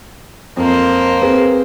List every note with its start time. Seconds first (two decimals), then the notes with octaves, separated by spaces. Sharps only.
0.57 F2 A#3 C5
1.22 C4 G#4 B4